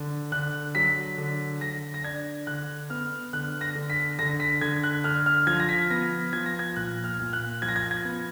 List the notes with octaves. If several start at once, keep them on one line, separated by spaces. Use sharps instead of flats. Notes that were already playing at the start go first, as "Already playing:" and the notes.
Already playing: D3
D3 F#6
F#3 B6
D3
D3 A#6
A#6
D4 G#6
D3 F#6
B3 F6
D3 F#6
A#6
D3
B6
D3 A#6
B6
D3 G#6
F#6
D3 F6
F6
F3 G#6
A#6
B6
B3 A#6
F3 G#6
A#6
G#6
A#2 F#6
F6
A#2
F#6
F3 G#6
A#6
G#6
G#6
B3